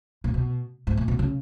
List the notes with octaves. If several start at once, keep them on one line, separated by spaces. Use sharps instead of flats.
A#2
B2
G#2
A#2
B2
C#3